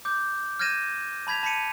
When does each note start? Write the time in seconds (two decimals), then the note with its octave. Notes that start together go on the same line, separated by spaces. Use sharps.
0.05 D6 G6
0.60 F6 G6 G#6 A#6 D#7 E7
1.27 A5 B5 G#6 B6 F7
1.43 A5 B5 B6 C#7 D#7